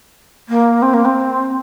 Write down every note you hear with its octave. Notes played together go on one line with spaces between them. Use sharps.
A#3
C4
A#3
C4